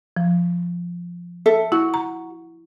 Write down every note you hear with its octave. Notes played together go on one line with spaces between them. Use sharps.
F3
A4 E5
E4 F#4
A#5